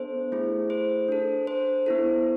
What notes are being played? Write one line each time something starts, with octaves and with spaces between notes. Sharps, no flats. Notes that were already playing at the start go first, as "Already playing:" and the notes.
Already playing: B3 D4 A4 C5
A3 E4 G#4
C5
D4 A4
C5
B3 E4 A4